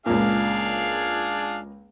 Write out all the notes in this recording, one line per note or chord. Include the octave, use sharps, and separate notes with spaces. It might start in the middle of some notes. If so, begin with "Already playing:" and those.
C#2 A#2 D4 G#4 F5